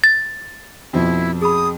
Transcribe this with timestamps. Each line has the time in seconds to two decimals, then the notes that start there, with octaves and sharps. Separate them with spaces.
0.04 A6
0.93 F2 B2 F3 E4
1.42 G#4 B5 D#6